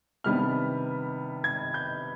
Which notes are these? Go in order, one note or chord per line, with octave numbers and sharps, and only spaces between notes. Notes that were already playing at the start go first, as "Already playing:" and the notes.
C3 D#3 G3 B3 D4 F6
G#6
G6